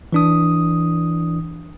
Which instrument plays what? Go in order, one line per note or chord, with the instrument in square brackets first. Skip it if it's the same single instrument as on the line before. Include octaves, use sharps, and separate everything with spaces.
[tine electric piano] E3 D4 D#6